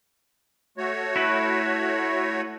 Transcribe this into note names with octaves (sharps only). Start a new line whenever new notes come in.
A3 F#4 C#5
E4 B4